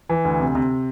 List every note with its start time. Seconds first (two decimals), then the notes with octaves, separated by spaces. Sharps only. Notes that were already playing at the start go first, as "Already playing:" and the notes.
0.09 E3
0.25 D2
0.40 C3
0.55 C3